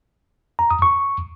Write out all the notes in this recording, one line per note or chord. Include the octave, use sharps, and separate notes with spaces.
A#5
D#6
C#6